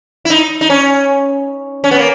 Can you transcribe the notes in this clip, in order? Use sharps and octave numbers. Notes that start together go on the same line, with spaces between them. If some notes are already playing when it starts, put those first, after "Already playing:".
E4
D#4
D#4
C#4
C#4
B3
A#3